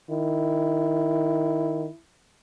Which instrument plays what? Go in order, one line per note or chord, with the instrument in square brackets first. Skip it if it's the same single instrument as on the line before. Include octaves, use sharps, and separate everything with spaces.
[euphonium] D#3 [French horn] E4